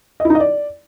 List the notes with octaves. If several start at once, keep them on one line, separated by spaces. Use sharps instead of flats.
D#5
E4
D#4
D#5
D5